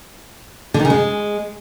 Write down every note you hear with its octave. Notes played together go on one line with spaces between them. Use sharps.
D3
D#3
C#3
G#3